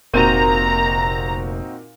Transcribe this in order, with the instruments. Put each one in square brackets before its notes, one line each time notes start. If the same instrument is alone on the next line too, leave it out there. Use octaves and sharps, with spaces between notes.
[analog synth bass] F1 [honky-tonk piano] A#2 G6 D#7 [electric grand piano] C4 D#4 F#4 [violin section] A#5